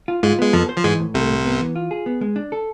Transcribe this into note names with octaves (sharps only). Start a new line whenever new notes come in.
F4
G#2 G#3 F4
G#3 B3
F2 F3 A4
C5
F3
G#2 E3 G#3
A2
C2 C3 A3
A2
B3
E3
F4
G#4
B3
G#3
D4
A4